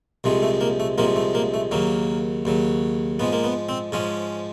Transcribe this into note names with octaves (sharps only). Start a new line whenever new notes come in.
C2 C3 F3 G#3
A3
A#3
A3
C2 C3 F3 G#3 A#3
A3
A#3
A3
D#2 C#3 F#3 A#3
D#2 C#3 F#3
G#2 F3 G#3 B3
A#3
B3
C4
G#2 F3 G#3 C#4